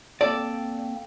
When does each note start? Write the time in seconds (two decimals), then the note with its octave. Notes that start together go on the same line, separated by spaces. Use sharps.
0.21 A#3 C4 A4 D5